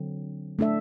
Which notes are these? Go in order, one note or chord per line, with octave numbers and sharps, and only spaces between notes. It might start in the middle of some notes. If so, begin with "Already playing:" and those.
Already playing: D3 F#3 C4
A3 D4 A4 E5